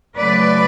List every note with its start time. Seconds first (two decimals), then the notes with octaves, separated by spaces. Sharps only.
0.17 C#3 F#3 A3 B4 D5